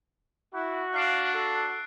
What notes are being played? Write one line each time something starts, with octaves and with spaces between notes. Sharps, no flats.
E4 F#4
D4 F5 F#6 C7 D7
A4